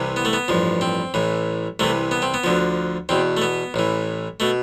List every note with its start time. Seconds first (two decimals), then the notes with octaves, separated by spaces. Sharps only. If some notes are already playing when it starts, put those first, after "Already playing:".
Already playing: C2 C3 E3
0.16 B3
0.25 A3
0.33 B3
0.48 A1 G2 F3
0.81 C4
1.14 A1 A2 E3
1.80 C2 C3 E3 A3
2.11 B3
2.22 C4
2.34 B3
2.44 D2 D3 F3
3.09 E2 B2 C4
3.37 A3
3.42 B3
3.74 A1 A2 E3
4.40 B2 A3